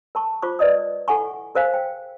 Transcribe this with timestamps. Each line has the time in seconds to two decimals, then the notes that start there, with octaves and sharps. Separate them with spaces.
0.15 A#4 A5 C#6
0.42 F4 C5 C#6 D6
0.59 B4 D5 D#5 D#6
1.08 E4 A4 F#5 G#5 C#6
1.55 G#4 A#4 C5 F5 G#5
1.74 G5